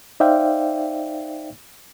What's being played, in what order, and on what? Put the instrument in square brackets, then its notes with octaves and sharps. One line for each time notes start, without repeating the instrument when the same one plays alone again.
[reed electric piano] D#4 C5 D5 E5 F5 G5